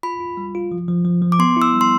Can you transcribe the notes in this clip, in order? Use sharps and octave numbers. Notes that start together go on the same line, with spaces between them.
F4 B5
F4
G3
F4
F3
F3
F3
F3
D6
B3 C6
E4
E6
G3
C6